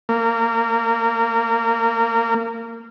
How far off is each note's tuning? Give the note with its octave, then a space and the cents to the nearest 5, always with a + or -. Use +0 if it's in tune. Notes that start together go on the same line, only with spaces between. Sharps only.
A#3 -20